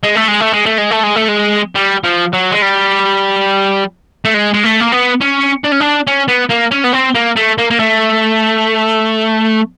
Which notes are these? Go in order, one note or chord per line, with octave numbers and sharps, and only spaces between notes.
G#3
A3
G#3
A3
G#3
A3
G#3
A3
G#3
A3
G#3
G3
F3
F#3
G#3
G3
A3
G#3
G#3
A3
A#3
B3
C#4
D4
C#4
D4
C#4
B3
A#3
C#4
B3
C4
A#3
A3
A#3
A#3
A3